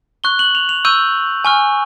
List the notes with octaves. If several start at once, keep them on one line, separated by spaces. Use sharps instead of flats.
C#6 F#6 G7
F#7
F7
F7
C#6 E6 G6 D#7
G#5 C#6 F6